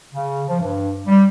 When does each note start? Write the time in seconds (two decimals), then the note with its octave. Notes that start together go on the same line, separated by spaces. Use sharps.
0.13 C#3
0.48 F3
0.60 G2
1.07 G3